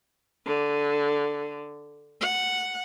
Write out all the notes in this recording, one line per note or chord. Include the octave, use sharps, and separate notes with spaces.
D3
F#5